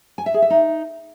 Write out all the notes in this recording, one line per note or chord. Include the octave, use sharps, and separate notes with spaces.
G#5
E5
G#4
E5
D#4